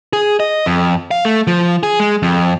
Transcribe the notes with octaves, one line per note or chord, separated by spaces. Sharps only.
G#4
D#5
F2
F5
A3
F3
G#4
G#3
F2